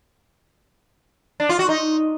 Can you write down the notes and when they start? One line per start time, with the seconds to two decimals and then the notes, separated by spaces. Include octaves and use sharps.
1.40 D4
1.49 F4
1.59 F#4
1.69 D#4